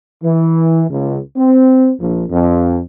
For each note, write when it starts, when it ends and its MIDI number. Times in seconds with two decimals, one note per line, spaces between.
0.24 0.84 52
0.90 1.18 37
1.37 1.92 60
2.00 2.25 34
2.30 2.80 41